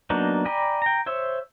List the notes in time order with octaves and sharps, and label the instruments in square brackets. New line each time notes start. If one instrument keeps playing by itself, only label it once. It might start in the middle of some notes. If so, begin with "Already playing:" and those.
[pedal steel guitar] F#3 A#3 B3 D4 D#4
D5 G5 G#5 A#5 B5
G5 A#5
C5 C#5 E5